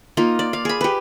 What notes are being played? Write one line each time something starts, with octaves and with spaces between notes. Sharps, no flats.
A#3 D#4 F4
D5
F5
G#4 B5
G4 B4